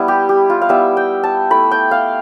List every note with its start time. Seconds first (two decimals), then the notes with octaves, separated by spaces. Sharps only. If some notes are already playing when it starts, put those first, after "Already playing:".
Already playing: G3 B3 E4
0.08 G4
0.29 G4
0.50 F4
0.62 F5
0.69 G3 B3 E4 E5
0.97 G5
1.24 A5
1.51 A3 E4 B5
1.71 G5
1.91 F5